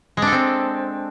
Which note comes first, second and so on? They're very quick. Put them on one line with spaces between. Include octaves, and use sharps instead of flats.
G#3 D4 A4 C4